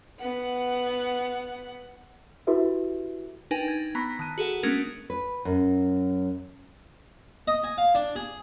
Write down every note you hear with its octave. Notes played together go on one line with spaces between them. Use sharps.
B3 F#5
E4 F#4 G4 A4 B4 E5
D4 D#4 A#4 B4 G5 G#5
G#6 A6
B3 A#5 B5 C#6 A#6
D#3 A5 F#6 D#7
F#4 G#4 A4 F#5
G#3 A#3 B3 C#4 D4 A#4
B4
F#2
D#5
G#5
F5
D4
G#4